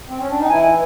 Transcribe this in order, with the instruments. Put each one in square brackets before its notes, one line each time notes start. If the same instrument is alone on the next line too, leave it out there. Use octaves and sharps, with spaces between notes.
[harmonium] C4
C#4
D4
D#4
[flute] G5
[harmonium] E3 E4 [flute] G#5